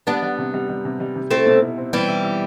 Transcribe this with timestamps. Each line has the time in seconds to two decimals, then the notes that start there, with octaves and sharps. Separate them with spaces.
0.07 G3 B3 D4
0.22 G3
0.39 C3
0.54 G3
0.69 G3
0.85 C3
1.00 G3
1.16 C3
1.31 A3 C4 E4
1.47 B2
1.62 E4
1.78 C4
1.93 B2 E3 G3
2.08 E4
2.24 E4